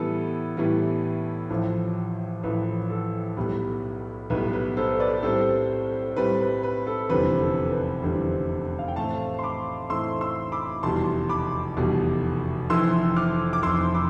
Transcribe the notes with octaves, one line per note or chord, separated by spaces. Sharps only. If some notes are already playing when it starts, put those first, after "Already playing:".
Already playing: A2 E3 G3 B3 A4
A2 E3 G3 B3
A1 A2 F3
A1 A2 F3 B4
A4
B1 A2 G3 B3 B4
B1 A2 G3 B3 B4
B4
A4 C5
B4 D5
A2 G3 C4 A4 C5
A2 G3 C4 B4
B4
B4
A4
F1 E2 D3 G3 C4 B4
A4
B4
F1 E2 D3 G3 C4
F5
G5
A2 E3 A3 C4 F5 A5
C6
B5 D6
A2 E3 A3 C4 C6 E6
C6 E6
B5 D6
F1 E2 B2 G3 A5 C6
B5 D6
F1 E2 B2 G3
F1 F2 E3 C6 E6
D6 F6
D6
F1 F2 E3 C6 E6
B5 D6